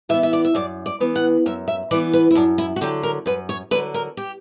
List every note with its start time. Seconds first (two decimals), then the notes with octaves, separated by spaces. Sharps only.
0.09 E3 E5
0.14 B3
0.23 E5
0.33 D5
0.45 E5
0.55 F#2 D5
0.86 D5
1.00 E3 B3
1.16 F#5
1.46 F#2 E5
1.68 E5
1.91 E3 D5
1.94 B3
2.13 B4
2.31 E4
2.35 F#2 D4
2.58 E4
2.76 F#4
2.81 D3 F#3 G4
3.03 A#4
3.26 F#2 B4
3.49 C#5
3.71 D3 F#3 B4
3.94 A#4
4.17 G4